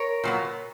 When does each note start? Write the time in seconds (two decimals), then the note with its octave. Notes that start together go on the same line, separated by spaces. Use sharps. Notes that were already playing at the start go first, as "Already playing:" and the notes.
Already playing: A#4 C#5
0.24 A#2 F#3 B3